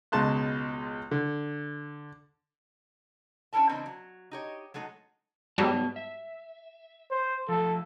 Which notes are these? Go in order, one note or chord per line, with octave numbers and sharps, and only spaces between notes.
C#2 B2 G#3 A5 C6 F#6
D3
C#4 D4 E4 A4 A#4 A5
C#3 E3 A#3 C4 D4 D#4
F#3
D#4 G4 C#5
F#3 G#3 A3 D#4
G#2 F#3 G3 B3 A5
E5
C5
F3 A3 A4